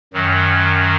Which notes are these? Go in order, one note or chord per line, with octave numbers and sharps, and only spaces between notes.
F#2 D#3 F#3